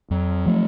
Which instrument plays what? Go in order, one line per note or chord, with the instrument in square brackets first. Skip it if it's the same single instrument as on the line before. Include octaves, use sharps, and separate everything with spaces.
[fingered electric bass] F2 [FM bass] F#3
[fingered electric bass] F3 A3